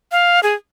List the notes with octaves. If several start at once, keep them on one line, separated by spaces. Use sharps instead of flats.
F5
G#4